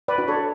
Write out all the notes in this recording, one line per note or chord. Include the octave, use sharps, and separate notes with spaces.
B4 D5
D4 F#4
A4 C#5